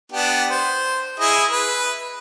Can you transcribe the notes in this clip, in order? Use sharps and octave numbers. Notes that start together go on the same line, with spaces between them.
B3 D4 G4
C5
E4 G#4 D#5
B4